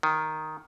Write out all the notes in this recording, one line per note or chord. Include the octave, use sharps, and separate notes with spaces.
D#3